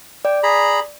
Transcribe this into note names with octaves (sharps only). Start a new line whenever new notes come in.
D5 G5
G#4 A#5 B5